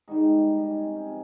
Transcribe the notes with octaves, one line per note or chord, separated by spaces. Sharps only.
G#2 D#3 G3 D#4
D#4
C#4
C4
C#4
C3 F3